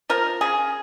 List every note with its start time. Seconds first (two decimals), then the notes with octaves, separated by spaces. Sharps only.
0.09 F3 A#4
0.41 C#3 G#4